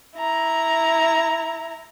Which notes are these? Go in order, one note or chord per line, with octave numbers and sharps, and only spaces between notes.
E4 A#5